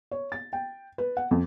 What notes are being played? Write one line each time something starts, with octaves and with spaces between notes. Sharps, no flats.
C#5
A6
G5
B4
F#5
F2